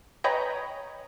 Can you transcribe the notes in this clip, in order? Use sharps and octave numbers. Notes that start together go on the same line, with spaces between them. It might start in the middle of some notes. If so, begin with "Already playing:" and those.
B4 C#5 D#5 G5 G#5 A#5